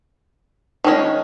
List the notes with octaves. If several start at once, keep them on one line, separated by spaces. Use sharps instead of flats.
D#3 G#3 C#4